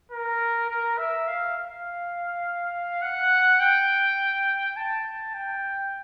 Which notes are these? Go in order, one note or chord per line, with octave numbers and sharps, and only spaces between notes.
A#4
A#4
E5
F5
F5
F#5
G5
A5
G5